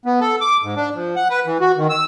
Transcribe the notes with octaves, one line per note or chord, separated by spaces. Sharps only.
B3
A4
D6
G#2
D4
F3
F#5
B4
E3
F#4
D#3
E6